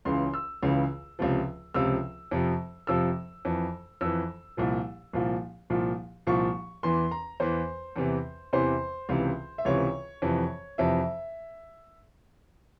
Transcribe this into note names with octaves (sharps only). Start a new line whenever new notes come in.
C#2 C#3 E3 C6
E6
C#2 C#3 E3
C#2 C3 F3
C#2 C3 F3 E6
F2 C3 F3
F2 C3 F3 E6
F2 E3
F2 E3 E6
C2 A#2 F3
C2 A#2 F3
C2 A#2 F3
C2 A#2 F3 C#6
E2 E3 C6
A#5
E2 E3 C5
E2 C3 E3
E2 C3 E3 C5
C#2 C3 E3
E5
C#2 C3 E3 C#5
F2 C3 E3
F2 C3 E3 E5